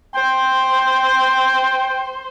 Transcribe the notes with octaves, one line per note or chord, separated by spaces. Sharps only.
C5 G5